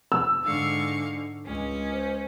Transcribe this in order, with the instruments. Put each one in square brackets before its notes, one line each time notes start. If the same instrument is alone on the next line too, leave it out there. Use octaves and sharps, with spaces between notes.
[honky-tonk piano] E6
[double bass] G#2 D3 [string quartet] G#3 F5 C#6
[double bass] C#2 G#3 [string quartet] C#4
[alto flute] C5